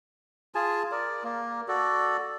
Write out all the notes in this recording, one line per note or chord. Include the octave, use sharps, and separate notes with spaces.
F4 G#4 G#5 A5
A#4 D5
A#3
F#4 A4 D5